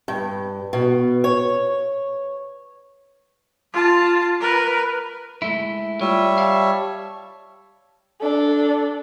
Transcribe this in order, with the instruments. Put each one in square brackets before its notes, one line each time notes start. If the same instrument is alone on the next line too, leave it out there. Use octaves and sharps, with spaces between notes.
[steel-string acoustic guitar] G2
B2
C#5
[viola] F4 A5
A#4 B4
[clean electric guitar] G#3 A3 E4
[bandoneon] G3 C#5 E5 [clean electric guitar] F4
[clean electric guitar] F5 F#5 A5
[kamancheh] D4 A4